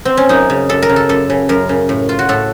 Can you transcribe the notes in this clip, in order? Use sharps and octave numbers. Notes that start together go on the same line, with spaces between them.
C4
C#4
F#2 D#4
C#3
F#2 A4
A#4
C#3
A4
F#2 A4
C#3
F#2 A#4
C#3
A2
F4
F#4
A2 A4